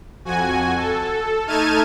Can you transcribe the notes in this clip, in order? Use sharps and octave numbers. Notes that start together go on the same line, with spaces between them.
F2 F#4 G#5
A4
A3 D#4 A5 F6 G#6 D#7